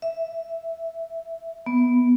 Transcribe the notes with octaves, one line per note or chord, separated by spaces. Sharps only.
E5
B3